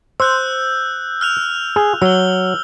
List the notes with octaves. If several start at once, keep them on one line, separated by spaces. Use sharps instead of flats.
C5 E6 F#6 G6
F6 F#6 F7
G#4
F#3 E6 G7